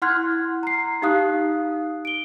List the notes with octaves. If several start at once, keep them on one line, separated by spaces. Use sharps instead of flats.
E4 F#5 C6 F6 F#6 G#6
A#5 C7
D#4 G4 F5 D#6 F#6
D7 G7